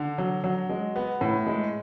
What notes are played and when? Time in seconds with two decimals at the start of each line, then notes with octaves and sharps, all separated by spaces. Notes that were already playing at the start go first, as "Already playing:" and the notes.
Already playing: D3
0.18 F#3
0.44 F#3
0.69 G#3
0.96 B3
1.21 A2
1.46 G#3